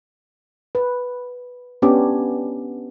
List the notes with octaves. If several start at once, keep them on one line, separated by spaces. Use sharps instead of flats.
B4
B3 C#4 D4 G4